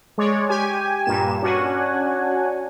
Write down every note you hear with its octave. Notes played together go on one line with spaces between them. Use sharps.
G#3 C#5 D5
G4 G#5
G2 A#2 A#3 E7
C#4 D4 F#4 F#5 G#5